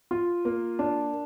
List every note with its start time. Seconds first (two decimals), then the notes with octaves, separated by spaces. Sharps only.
0.11 F4
0.45 A#3
0.79 D4